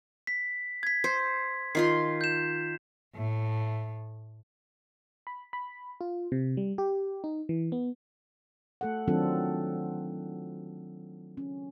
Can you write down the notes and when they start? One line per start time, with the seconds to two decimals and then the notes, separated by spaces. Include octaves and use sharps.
0.27 B6
0.83 G#6 B6
1.04 C5
1.75 D#3 F4 C6 C7
2.21 G6 E7
3.16 A2
5.27 B5
5.53 B5
6.01 F4
6.32 C3
6.57 G3
6.78 G4
7.24 D#4
7.49 E3
7.72 B3
8.81 A3 A4 F#5
9.08 D#3 F#3 C4 D4 F4 A4
11.37 C#4